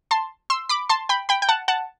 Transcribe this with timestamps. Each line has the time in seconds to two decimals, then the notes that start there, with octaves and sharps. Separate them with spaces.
0.11 A5 C6
0.50 C6 E6
0.69 B5 D6
0.89 A5 C6
1.09 G5 B5
1.29 G5 B5
1.42 G5
1.49 F#5 A5
1.68 F#5 A5